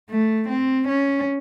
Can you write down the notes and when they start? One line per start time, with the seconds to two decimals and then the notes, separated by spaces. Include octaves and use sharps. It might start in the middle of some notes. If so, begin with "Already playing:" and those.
0.10 A3
0.49 C4
0.88 C#4